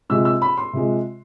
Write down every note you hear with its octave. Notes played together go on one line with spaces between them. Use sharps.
C3 F3 G#3 E6
E6
B5
C6
C3 F3 G#3